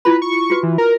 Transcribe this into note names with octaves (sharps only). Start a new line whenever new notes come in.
E4 F4 B4 B5
C#6
F4 F#4 B4
E3
A#4